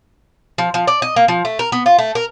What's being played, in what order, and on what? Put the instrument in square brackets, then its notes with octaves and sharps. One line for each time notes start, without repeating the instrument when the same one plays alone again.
[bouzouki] F3
F3
D5
D#5
A#3
F3
A3
A#4
B3
F4
A3
A#4